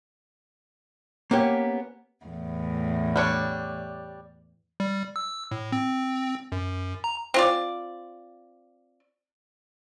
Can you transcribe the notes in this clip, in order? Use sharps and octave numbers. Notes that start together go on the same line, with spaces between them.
A#3 B3 C#4 G4
E2 A2
G3 D4 C#5
G3
E6
A2
C4
F#2
A#5
C4 F4 D5